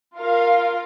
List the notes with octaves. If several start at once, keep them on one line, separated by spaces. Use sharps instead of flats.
F4 A#4 F5